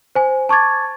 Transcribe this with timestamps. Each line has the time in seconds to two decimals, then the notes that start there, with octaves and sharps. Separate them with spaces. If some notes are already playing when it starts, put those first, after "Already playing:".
0.15 C5 G#5
0.49 A5 C#6 D6 G#6 A6